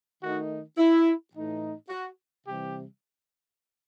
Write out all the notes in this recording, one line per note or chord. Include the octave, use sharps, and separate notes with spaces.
D#3 A3 D#4 F#4
E4
A2 E3 A3 D#4
F#4
C3 E3 G3 G4